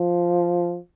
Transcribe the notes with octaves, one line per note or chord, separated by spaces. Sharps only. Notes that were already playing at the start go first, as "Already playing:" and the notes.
Already playing: F3